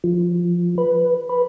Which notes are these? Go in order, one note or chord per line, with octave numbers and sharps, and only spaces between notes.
F3
B4
B4